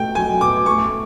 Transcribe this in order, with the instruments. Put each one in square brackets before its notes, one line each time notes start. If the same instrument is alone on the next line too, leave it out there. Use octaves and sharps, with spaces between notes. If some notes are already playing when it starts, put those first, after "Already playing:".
Already playing: [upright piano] B2 A3 [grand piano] G5
[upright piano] F#3 [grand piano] G#5
[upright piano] B2 [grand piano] D6
[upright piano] A3 [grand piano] C#6